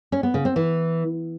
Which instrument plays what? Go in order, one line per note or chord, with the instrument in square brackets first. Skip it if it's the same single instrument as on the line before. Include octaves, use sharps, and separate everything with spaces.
[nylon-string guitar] C#4
B3
C#3
C4
E3